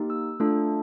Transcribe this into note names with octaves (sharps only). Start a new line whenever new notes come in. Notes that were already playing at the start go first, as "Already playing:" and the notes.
Already playing: A#3 D#4 G4
E6
A3 D4 F4 A4